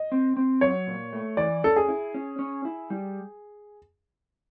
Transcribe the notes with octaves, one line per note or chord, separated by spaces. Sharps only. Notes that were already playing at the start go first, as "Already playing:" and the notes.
Already playing: D#5
C4
C4
F#3 C#5
A#2
A3
E3 D5
C#4 A4
G#4
E4
C#4
C#4
E4
G3